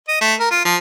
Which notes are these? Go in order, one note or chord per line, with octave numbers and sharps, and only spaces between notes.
D#5
A3
A#4
F4
F3